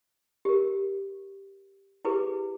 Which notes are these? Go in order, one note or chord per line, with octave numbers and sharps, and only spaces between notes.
G4 A#4
E4 G4 G#4 B4 D6